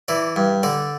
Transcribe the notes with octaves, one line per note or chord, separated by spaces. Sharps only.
E3 D5
G2
D3 D5